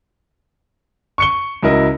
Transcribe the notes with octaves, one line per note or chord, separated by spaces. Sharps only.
C#6 C#7 G7
C#2 F#3 E4 A#4 D#5